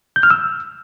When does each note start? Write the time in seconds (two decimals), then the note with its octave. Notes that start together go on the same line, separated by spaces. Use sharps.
0.16 G6
0.23 F6
0.31 E6